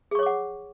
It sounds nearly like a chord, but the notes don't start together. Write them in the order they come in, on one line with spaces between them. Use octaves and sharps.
G#4 C#6 C#5 D6 F#5